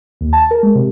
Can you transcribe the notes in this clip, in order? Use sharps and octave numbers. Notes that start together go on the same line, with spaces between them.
D#2
A5
A#4
G#3
C3